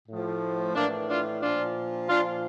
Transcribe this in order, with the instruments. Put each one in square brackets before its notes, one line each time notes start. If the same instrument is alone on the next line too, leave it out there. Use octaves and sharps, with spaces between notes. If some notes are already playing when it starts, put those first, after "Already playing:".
[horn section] A2 F3
A2 E3 A#3 D4
D4 F4
A#2 F3 D4 F4
A#2 F3 D4 F4